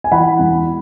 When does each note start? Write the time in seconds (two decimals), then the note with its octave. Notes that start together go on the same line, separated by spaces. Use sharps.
0.04 G#5
0.12 E3 F#5 B5
0.39 E1